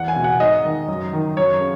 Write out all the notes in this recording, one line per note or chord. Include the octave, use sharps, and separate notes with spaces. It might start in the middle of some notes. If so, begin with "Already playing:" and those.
Already playing: E2 F#5
G#5
B2
F#5
G#2 D#5
D#3
F#2
D#3
F#2 C#5
C#3